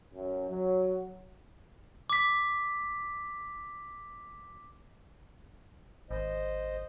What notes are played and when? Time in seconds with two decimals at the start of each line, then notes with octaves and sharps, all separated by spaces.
0.13 F#2
0.49 F#3
2.10 D6 B6
6.11 G#1 C5 D#5